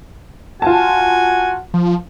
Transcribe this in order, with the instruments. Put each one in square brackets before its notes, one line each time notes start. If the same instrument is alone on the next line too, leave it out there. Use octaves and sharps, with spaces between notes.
[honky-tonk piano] F4 A5 [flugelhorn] F#4 [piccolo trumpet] G#5
[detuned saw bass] F3